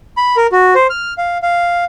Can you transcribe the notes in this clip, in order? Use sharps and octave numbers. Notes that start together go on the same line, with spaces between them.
B5
A#4
F#4
C5
F6
F5
F5